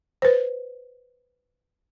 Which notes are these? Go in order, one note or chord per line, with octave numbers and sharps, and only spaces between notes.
B4 C5